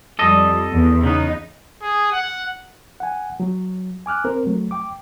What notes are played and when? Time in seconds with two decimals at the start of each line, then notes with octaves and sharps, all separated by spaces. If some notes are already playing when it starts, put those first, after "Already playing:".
0.19 F2 G3 A4 D#5
0.71 E2
1.03 C#3 B3 D#4
1.82 G#4
2.12 F#5
3.00 F#5 G#5
3.40 F#3
4.06 G#5 D6 F6 F#6
4.24 C4 A#4 C5
4.47 F#3 A3
4.71 G5 D6